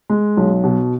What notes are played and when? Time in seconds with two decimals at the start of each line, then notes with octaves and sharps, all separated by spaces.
0.10 G#3
0.37 B1
0.64 B2